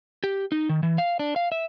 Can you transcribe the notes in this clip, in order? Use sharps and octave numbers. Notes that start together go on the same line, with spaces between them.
G4
D#4
D#3
E3
F5
D4
F5
E5